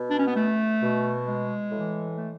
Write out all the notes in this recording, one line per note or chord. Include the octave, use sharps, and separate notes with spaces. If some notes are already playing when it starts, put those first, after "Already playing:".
Already playing: B2
D4
C#4
B3
A3
B2
G#3
A2 E3
A3